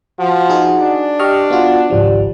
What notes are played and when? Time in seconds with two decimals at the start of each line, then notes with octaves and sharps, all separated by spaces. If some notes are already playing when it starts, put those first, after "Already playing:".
0.19 F3 F#4
0.49 D#4 G#4
0.80 D4
1.19 G4 D#5 C#6 F6
1.50 B3 F4 F#4
1.90 G#1 C#2 F3 G3